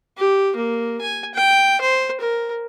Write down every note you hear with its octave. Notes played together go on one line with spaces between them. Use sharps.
G4
A#3
G#5
G5
C5
A#4